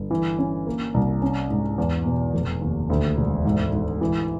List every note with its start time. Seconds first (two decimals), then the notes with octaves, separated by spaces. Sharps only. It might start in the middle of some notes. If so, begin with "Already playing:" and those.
Already playing: G1
0.11 E3
0.39 C#4
0.67 A#3
0.94 C2
1.22 C#4
1.50 G#2
1.78 E2
2.06 B2
2.34 F1
2.62 D#2
2.90 D2
3.17 E1
3.45 G#2
3.73 G#2
4.01 E3